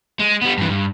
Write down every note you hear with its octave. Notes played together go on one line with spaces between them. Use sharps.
G#3
G3 B3
G2 E3
G2